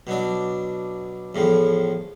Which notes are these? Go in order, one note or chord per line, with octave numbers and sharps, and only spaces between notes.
B2 F#3 D4
E2 A2 F3